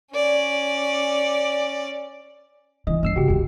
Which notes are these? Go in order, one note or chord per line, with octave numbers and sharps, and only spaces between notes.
C#4 D5
E3 D#5
A#1 G2 E6 C7
C#3 F#4 G4
F#2 D3 G4